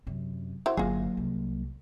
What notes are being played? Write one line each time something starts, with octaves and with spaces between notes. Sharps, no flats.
F#2 C3
E4 F#4 C5
G1 D3 F#3 A#3 F4 G#4
C2